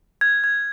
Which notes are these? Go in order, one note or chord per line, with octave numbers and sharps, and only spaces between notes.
F6 G#6
F6 G#6